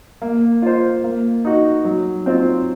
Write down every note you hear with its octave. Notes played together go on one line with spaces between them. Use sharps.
A#3
F4 C5
A#3
D#4 F#4
F#3
C4 F4 C5